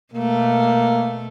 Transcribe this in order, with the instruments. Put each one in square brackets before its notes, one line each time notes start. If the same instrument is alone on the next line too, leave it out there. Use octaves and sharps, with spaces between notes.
[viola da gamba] B2 A3 [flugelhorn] A#3